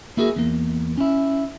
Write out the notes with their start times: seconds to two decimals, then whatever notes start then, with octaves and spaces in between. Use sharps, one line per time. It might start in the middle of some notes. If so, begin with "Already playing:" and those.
0.17 A#3 E4 F#4 G#4 A#4
0.36 E2 A#3
0.98 C#4 E4